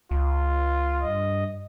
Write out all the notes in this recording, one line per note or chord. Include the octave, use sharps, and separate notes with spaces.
C#2 F4
G2 D#5